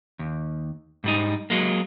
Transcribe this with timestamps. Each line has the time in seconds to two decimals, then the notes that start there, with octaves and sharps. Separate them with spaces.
0.19 D#2
1.04 G#2 G3 D#4
1.50 F#3 G#3 A#3